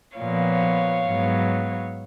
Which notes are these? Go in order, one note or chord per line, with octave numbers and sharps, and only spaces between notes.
A#2 F3 B3 C#5 F5
G#2 F#3 B3